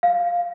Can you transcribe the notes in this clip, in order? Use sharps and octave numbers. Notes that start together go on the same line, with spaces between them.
F5